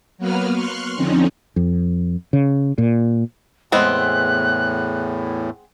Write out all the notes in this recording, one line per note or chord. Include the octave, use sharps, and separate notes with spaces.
F#3 A#3 B3 B4 F6
C6 C#6 F6 F#6
F2 D3 F3 C4 C#4 D#4
F2
C#3
A#2
E2 A2 G#3 B3 C4 F#6